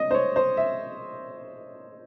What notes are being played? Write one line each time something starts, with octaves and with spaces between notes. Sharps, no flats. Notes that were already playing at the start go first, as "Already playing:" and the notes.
Already playing: D#5
C5
C#5
C5
E5